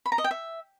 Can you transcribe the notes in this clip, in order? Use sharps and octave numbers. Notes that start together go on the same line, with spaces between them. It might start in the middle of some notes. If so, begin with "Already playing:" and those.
B5
A#5
D#5
G5
E5